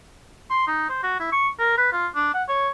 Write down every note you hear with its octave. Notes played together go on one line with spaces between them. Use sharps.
C6
D#4
C5
F#4
E4
C#6
A#4
B4
F4
D4
F#5
C#5